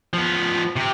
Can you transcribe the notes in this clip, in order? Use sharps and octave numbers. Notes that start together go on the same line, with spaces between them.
F3 B3
C3 G4